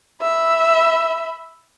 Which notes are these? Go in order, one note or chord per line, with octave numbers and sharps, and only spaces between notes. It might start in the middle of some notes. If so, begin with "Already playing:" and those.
E5 B5